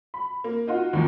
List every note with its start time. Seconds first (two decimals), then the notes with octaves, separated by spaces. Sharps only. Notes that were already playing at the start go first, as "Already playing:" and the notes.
0.14 B5
0.44 A#3
0.67 D#4 F4 F#4
0.93 D#2 F3